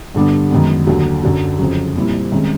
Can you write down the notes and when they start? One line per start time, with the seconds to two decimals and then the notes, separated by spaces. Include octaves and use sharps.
0.15 G2 D3 G3 B3 D4
0.51 F#2 D#3 G#3 B3
0.87 D#2 D3 F#3
1.23 F#2 D3 F#3
1.59 F2 C#3 F#3
1.96 A#2 G3 C4 E4
2.32 C2 C3 D#3 G#3 C#4